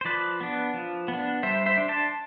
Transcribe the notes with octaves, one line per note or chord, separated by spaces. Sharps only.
C5
F3 B4 D5
B3 D4
F3
B3
D4
G3 C5 E5
C5 E5
D4
A5 C6